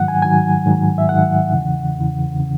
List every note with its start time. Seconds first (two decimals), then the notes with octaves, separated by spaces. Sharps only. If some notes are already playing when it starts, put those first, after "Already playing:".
Already playing: G#2 D#3 F#3 F#5
0.08 G#5
0.22 G#2 D#3 F#3 G#5
0.66 G#2 D#3 F#3
0.98 E5
1.09 G#2 D#3 F#3 F#5
1.53 E2 C#3 E3
1.96 E2 C#3 E3
2.40 C#3 E3